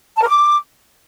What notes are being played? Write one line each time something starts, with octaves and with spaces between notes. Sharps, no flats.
A5
A#4
D6